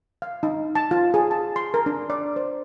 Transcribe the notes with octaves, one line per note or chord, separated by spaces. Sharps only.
F5
D#4
A5
F4
G#4
A5
C6
A#4
D4
D5
C5